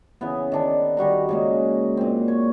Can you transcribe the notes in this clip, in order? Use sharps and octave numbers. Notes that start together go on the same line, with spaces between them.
C#3 E3 B3
D#3 D4
D#3 G3 F#4 A#5
C#3 G#3 A#3
A#2 C4
C#5